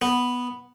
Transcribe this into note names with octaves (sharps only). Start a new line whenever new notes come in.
B3